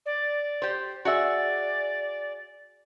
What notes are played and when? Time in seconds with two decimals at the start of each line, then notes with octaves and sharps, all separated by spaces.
0.06 D5
0.62 G4 C5
1.05 F#4 G#4 D5 E5